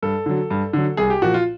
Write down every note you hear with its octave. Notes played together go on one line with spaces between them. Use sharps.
G2 A4
D3 F#3
G2
D3 F#3
C2 G#4
G4
A#2 F3 F#4
F4